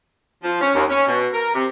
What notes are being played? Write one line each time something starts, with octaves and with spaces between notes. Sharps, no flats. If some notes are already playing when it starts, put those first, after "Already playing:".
F3
C#4
D#2
C#4
B2
A#4
C3